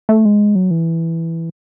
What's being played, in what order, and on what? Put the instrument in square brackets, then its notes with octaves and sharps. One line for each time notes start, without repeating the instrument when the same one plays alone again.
[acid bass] A3
G#3
F#3
E3